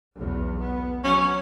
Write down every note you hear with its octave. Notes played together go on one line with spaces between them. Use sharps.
B1 E2
B3
F#3 C#4